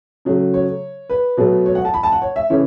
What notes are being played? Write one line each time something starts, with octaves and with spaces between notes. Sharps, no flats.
C#3 F#3 A3
C#5
B4
B2 F#3 A3
C#5
F#5
A5
B5
A5
F#5
C#5
E5
C#3 E3 A3 C#5